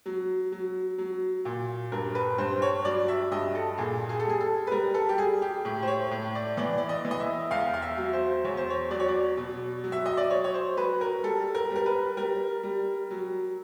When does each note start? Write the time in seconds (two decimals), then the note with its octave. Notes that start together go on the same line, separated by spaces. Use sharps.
0.06 F#3
0.52 F#3
0.98 F#3
1.45 A#2
1.92 G2 A#4
2.15 B4
2.38 G2 C5
2.62 C#5
2.85 F#3 D5
3.08 E5
3.31 G2 D#5
3.55 A4
3.78 A#2 G#4
4.09 G#4
4.20 A4
4.25 G3 G#4
4.41 A4
4.67 B4
4.71 G3 A#4
4.94 A4
5.09 G4
5.18 G3 G#4
5.42 G4
5.65 A2 G4
5.83 C5
5.88 C#5
6.11 A2
6.35 D5
6.57 E3 D5
6.78 D5
6.89 D#5
7.05 E3
7.11 D#5
7.20 E5
7.51 E2 F5
7.74 F5
7.82 E5
7.97 F#3
8.13 C5
8.45 E2 C#5
8.57 C5
8.70 C#5
8.91 F#3 D5
9.00 C#5
9.08 D5
9.37 B2
9.84 F#3
9.92 E5
10.06 D#5
10.17 D5
10.30 F#3 C#5
10.44 C#5
10.54 C5
10.77 F#3 B4
11.01 A#4
11.23 G3 A4
11.55 A#4
11.70 G3
11.76 A#4
11.86 B4
12.17 G3 A#4
12.63 G3
13.11 F#3